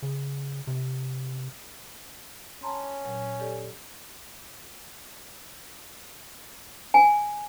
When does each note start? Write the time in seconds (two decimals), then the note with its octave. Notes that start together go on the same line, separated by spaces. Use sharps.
0.02 C#3
0.67 C3
2.63 C#4 A5 A#5 C6
3.05 A#2 F#3
3.40 G4 A4 D5
6.94 G#5